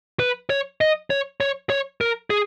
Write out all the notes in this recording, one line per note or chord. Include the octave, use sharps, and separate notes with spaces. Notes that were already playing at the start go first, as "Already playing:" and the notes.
B4
C#5
D#5
C#5
C#5
C#5
A#4
G#4